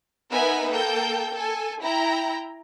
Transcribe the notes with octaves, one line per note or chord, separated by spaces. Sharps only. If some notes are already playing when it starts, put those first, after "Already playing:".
B3 D#4 A#4 B4 E5 G#5
A#3 A4 G5 G6
A4 G#5
E4 G5 A#5